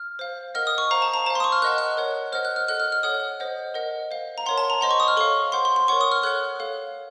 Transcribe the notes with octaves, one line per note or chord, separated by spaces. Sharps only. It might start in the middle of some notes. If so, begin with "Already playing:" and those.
Already playing: F6
C5 F5
A#4 D#5 F#5 F6
D#6
C#6
C5 F5 A#5
A5
A#5
C5 F5 A5
C6
D#6
C#6
F6
A#4 D#5 F#5 F#6
F#6
A#4 C#5 F#5
C5 D#5 F#5 F6
F#6
F6
A4 D#5 F#5 F#6
F6
F6
A4 C#5 F#5 D#6
C5 D#5 F#5
A#4 D#5 F#5
C5 F5
A#5
A#4 C#5 F#5 C6
A5
A#5
C5 D#5 F#5 C6
C#6
D#6
F6
A4 C#5 F5 C#6
C5 F#5 C6
C6
C6
A#4 C#5 F#5 C#6
D#6
F6
A4 C#5 F#5 F#6
A4 C#5 F5